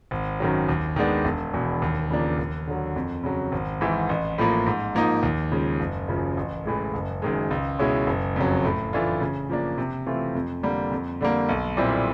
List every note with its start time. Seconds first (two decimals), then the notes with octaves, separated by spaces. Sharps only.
0.11 G#1
0.40 F#2 D#3 F#3
0.69 D#2
0.96 D#3 G#3 B3 D4
1.25 E1
1.54 E2 B2
1.82 D#2
2.10 C#3 F3 A#3 D4
2.39 D#2
2.67 D3 F#3
2.96 F2
3.23 C#3 F#3
3.52 G#1
3.81 G#2 E3
4.09 A1
4.38 A2 F3 A#3
4.66 G#2
4.95 F3 A#3 D#4
5.23 D#2
5.51 C#3 F3 G#3
5.80 F#1
6.08 F#2 C#3 F3
6.37 A1
6.65 A2 E3 G#3
6.94 F#1
7.22 F#2 D#3 G#3
7.51 C#2
7.79 B2 G#3 C#4 E4
8.07 F#1
8.36 F2 C#3 F#3
8.65 A2
8.93 E3 A3 D4 F4
9.21 C#3
9.50 F3 A#3 D4
9.78 C3
10.06 E3 A3 C4 F4
10.35 F2
10.63 D3 G3 A#3
10.92 F2
11.21 D3 G3 A#3
11.49 B1
11.77 A#2 G3 C4 E4